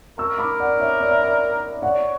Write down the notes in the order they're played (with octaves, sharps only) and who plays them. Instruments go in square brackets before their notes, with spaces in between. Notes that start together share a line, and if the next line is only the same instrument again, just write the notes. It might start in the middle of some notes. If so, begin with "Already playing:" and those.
[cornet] A#4 [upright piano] C#6 E6
[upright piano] B5 D6
D5 F#5
C#5 E5
D5
E5
D5
[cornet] C#5 [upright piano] D5 F#5